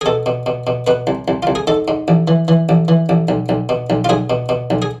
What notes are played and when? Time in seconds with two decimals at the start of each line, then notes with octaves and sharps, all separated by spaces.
0.01 G#4
0.06 B2 A4
0.26 B2
0.46 B2
0.67 B2
0.87 B2 B4
1.07 C2
1.28 C2
1.43 C2 F4
1.55 G#4
1.67 G#2 A4
1.88 G#2
2.08 A1
2.28 E3
2.48 E3
2.69 A1
2.88 E3
3.09 A1
3.28 B1
3.49 B1
3.69 B2
3.90 B1
4.04 F4
4.09 B1 G#4
4.30 B2
4.49 B2
4.70 B1
4.82 G#4